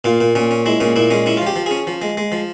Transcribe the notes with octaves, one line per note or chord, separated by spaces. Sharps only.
A#2 F4
A#2
A#2 C#4
C#4
G#3 E4
A#2 C#4
A#2 E4
G#3 C#4
C#4 E4
F4
F3 G4
F3
C#4 G#4
F3
G#3
G#3
F3